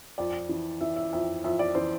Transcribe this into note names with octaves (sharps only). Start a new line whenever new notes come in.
F2 D5
E3
E3 E5
E5
F2 E5
F2 E5
D5
E3 C5